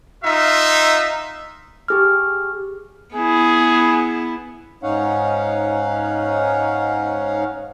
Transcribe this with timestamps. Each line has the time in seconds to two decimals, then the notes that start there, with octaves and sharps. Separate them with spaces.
0.24 D#4 F4 E5
1.88 G4 G#4 F6
3.14 B3 E4 G#4
4.83 G#2 C#4 D#4 C#5 F5 F#5